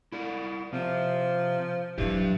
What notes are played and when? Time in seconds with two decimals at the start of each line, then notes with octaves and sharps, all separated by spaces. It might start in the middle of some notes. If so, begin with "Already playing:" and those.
0.12 E4 A#4 D5
0.73 C3 F3 C4
1.98 A2 E3 F#3 D4 G4